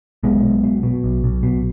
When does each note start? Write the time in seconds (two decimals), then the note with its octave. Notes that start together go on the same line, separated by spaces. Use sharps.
0.23 B1 G#3 B3
0.43 B1
0.64 B2
0.83 B2
1.04 B1
1.24 B1
1.43 B2